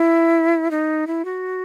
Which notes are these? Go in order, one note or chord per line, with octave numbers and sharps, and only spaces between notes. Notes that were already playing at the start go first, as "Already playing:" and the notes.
Already playing: E4
D#4
E4
F#4